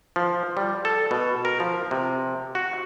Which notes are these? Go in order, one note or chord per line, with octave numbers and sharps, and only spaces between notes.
F3
G3
A4
B2
A#4
F3
C3
F#4